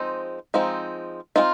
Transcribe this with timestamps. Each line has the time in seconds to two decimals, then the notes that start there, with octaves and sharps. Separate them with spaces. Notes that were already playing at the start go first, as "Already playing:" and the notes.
Already playing: F3 G#3 C4 D#4
0.54 F3 G#3 C4 D#4
1.36 G#3 C4 D#4 F4